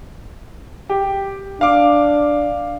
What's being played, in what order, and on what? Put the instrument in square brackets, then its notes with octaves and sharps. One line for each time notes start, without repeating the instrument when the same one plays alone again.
[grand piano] G4
[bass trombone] D4 [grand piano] F5 D6